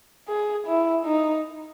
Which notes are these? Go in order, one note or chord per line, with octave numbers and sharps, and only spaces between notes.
G#4
E4
D#4